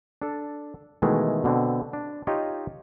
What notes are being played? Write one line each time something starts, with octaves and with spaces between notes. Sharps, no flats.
D4 A4
B2 D#3 E3 G#3 A3
B2 D3 C4
D4
D#4 F4 G4 C#5 D#5